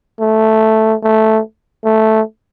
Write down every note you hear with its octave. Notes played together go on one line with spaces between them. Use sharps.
A3
A3
A3